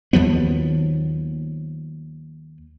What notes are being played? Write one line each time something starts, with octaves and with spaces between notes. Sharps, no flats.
D#2 F3 F#3 B3